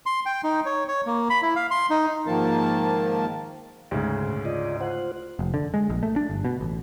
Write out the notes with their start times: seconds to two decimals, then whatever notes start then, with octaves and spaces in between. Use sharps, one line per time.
0.06 C6
0.26 G5
0.44 D#4
0.66 C#5
0.88 C#5
1.06 A#3
1.30 B5
1.42 E4
1.56 F5
1.71 C6
1.90 D#4
2.27 G#2 D#3 F3 A#3 A#4 A5
3.91 D2 G#2 C#3
4.28 A2
4.45 F4 D5 D#5
4.81 F4 C5 F#5
5.39 F1
5.54 D3
5.74 G#3
5.90 A#1
6.03 A3
6.16 D4
6.30 G1
6.45 B2
6.61 A1